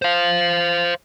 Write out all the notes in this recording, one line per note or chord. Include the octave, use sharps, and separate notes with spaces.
C5 F5